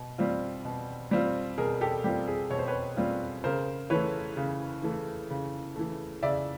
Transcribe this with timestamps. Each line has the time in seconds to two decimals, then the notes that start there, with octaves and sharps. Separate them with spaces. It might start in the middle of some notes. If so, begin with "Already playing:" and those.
Already playing: B2
0.18 G3 C4 F4
0.65 B2
1.11 G3 C4 F4
1.58 B2 G#4 A#4
1.81 G4 A4
2.04 G3 C4 F4 G4
2.27 G#4
2.50 B2 C#5
2.59 C5
2.68 B4 C#5
2.97 G3 C4 F4
3.44 C#3 A#4 C5
3.90 E3 A3 B4 C#5
4.37 C#3
4.83 E3 A3
5.30 C#3
5.76 E3 A3
6.23 C#3 D5 E5